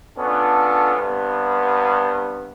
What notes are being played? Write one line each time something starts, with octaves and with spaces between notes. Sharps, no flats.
B3 C#4 D4 F4 A4
G2 C3 B3